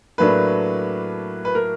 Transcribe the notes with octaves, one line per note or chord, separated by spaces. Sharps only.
A2 F#3 A#3 D4 B4
B4
A#4